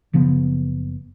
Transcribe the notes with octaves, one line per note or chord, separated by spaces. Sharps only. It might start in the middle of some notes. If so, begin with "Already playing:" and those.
F#1 C#3 F3 B3